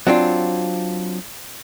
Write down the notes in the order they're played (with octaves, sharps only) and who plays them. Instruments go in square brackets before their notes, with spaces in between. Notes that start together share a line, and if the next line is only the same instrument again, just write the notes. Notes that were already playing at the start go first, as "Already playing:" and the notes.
[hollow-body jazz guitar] F#3 C4 D4 F4